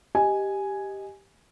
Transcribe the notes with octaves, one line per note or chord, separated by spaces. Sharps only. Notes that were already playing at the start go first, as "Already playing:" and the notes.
G4 D#5 G#5